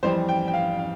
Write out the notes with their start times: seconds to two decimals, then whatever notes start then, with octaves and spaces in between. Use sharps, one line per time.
0.03 F2 E3 G3 C5
0.29 G5
0.48 G5
0.54 F5
0.79 F5